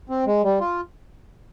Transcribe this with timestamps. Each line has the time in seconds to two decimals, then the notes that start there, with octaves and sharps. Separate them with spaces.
0.09 C4
0.27 G#3
0.44 G3
0.60 F4